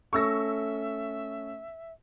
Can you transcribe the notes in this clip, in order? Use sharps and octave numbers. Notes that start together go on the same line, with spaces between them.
A3 C#4 A4 E5 C#6 E6 A#6